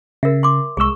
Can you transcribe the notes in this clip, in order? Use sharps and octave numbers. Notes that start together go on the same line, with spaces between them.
C#3 A#4 E5
C6 D6
C2 G#3 G#4 C#6 E6